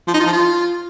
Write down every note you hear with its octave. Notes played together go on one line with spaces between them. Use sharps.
F3
D#4
F4
F3
F4